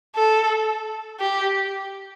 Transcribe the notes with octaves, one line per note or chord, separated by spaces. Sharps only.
A4
G4